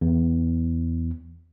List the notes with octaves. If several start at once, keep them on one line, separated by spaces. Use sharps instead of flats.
E2